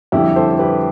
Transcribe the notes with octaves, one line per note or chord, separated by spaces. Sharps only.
F2 D3 G3 E4 G4
A4 C5
G4 B4